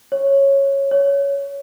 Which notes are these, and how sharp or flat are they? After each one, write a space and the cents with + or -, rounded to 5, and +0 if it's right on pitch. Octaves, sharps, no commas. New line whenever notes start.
C#5 -10
C#5 +10